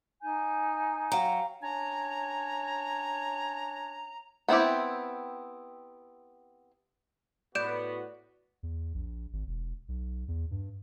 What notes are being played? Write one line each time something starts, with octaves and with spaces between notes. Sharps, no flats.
D#4 G#5 G6
F#3 F5 G5 A#5
C#4 D4 C#5 G#5 A#5
B3 C4 E4 G4
A2 B3 F#4 D5 G6 D7 E7
E2
A#1
G#1
E1
B1
E2
G2